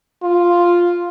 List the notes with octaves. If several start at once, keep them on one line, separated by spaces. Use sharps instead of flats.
F4